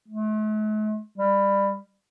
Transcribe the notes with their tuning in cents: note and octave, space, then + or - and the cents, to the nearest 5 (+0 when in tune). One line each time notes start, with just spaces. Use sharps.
A3 -45
G3 +20